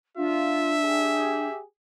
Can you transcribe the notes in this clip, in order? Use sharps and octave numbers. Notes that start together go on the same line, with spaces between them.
D4 F4 E5
G4 G#4 G#5